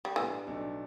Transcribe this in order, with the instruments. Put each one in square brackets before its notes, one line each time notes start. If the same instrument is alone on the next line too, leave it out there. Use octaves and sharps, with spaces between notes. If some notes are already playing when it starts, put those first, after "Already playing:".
[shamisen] G3
[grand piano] A2 G3 B3 D4 [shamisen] E3
[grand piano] B1 B2 A3 D4